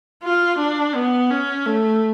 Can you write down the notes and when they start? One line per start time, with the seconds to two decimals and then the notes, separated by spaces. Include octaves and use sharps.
0.23 F4
0.58 D4
0.95 B3
1.31 C#4
1.66 A3